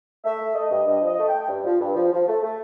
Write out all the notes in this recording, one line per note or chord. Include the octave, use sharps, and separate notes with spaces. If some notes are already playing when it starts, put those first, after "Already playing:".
A3 E5
A3
A3 D#5
G2
G2 D#5
F3 D#5
A3
A3 G5
G2
F3
G2
F3
F3
A3
A3